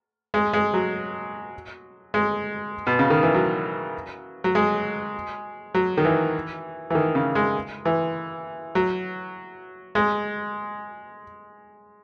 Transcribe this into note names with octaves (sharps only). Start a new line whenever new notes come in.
G#3
G#3
F#3
G#3
B2
C#3
D#3
E3
F#3
F#3
G#3
F#3
D#3
E3
E3
D#3
C#3
G#3
E3
F#3
G#3